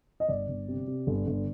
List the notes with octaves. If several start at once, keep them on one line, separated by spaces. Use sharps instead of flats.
D#5
G1 D5
G1
C3
C3
G1
G1